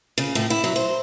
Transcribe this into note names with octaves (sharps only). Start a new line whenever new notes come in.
C#3
A2
E4
F#3
C5